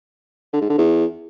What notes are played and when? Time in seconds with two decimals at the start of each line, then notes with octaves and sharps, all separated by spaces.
0.53 D3
0.61 G#2
0.70 D3
0.78 E2